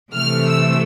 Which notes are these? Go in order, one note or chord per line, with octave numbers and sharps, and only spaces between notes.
C3 E3 A3 F6
E6